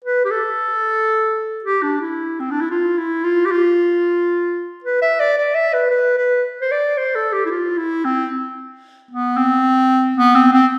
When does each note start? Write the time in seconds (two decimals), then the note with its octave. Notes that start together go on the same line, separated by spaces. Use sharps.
0.04 B4
0.25 G4
0.31 A4
1.64 G4
1.83 D4
2.01 E4
2.40 C4
2.51 D4
2.61 E4
2.71 F4
2.98 E4
3.24 F4
3.46 G4
3.51 F4
4.84 B4
5.02 E5
5.20 D5
5.38 D5
5.55 E5
5.73 B4
5.91 B4
6.18 B4
6.61 C5
6.72 D5
6.98 C5
7.15 A4
7.33 G4
7.46 E4
7.51 F4
7.78 E4
8.05 C4
9.11 B3
9.37 C4
10.17 B3
10.35 C4
10.53 C4